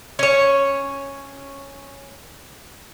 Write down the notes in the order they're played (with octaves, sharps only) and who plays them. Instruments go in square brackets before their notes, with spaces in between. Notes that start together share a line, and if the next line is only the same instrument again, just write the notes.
[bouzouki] C#4 C#5